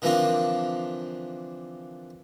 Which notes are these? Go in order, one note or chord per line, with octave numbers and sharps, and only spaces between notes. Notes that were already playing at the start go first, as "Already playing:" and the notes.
D3 E3 F3 A#3 C4 D4